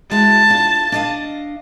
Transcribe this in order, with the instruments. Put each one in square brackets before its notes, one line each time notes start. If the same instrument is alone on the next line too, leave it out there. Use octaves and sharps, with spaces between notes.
[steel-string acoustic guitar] G#3 E4 F#4 [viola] A5
[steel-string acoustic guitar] D4 F4
D4 D#5 F5